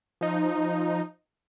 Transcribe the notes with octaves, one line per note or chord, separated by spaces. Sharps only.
F3 D#4